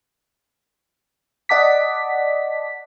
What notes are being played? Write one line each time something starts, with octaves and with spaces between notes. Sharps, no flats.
D5 D#5 F#5 A5 D6 B6